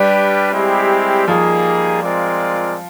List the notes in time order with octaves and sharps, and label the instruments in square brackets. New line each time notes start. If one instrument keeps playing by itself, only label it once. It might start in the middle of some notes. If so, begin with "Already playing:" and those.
Already playing: [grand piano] G3 [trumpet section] D4 G4 B4
[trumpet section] G#3 C4 E4 G4
[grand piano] F3 [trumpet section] G3 A#3 D#4 G#4
[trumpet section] G#3 C4 F4 A#4 D5